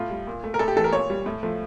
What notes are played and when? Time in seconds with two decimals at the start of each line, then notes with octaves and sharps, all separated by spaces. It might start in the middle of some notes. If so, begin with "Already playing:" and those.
Already playing: A2 F4
0.10 G3
0.27 A#2
0.44 A3
0.54 A#4
0.59 A2 A4
0.68 G4
0.76 E3 A3 A4
0.84 A#4
0.92 A#2 C#5
1.10 G3
1.26 A2
1.43 F3 A3